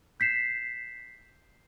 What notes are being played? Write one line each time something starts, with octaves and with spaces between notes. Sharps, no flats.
G6 B6 C7 E7